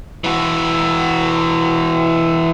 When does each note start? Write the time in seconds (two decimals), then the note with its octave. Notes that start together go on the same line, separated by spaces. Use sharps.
0.24 E3 F#4